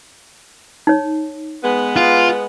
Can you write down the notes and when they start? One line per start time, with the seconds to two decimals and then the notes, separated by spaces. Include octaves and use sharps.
0.87 D#4 C#5
1.64 G#3 B3
1.97 F4